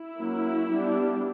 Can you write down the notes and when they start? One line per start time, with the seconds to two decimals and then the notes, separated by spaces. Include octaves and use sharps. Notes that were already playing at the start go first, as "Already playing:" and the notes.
Already playing: E4
0.19 F#3 A#3 C#4
0.70 G3 B3 D4